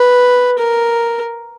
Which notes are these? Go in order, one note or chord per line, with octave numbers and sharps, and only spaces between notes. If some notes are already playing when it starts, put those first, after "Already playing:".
Already playing: B4
A#4